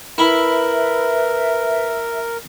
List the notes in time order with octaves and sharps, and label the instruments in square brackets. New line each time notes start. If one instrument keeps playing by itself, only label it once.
[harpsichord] E4 B5 [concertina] A#4 [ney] B4 [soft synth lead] E5